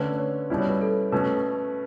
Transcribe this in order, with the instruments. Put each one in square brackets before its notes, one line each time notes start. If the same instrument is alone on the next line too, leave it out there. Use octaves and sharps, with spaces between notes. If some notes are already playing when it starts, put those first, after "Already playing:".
Already playing: [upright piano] D3 A3 C#4 [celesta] B4
[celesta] C#5
[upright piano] B2 G3 C#4 E4
[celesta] C#5
B4
A4
[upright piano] B2 A3 C#4 [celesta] B4